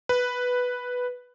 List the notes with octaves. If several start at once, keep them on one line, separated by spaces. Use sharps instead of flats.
B4